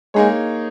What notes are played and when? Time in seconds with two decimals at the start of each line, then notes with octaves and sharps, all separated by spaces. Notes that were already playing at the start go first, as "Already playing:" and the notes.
0.14 G#3 A#3 D#4 G#4 C#5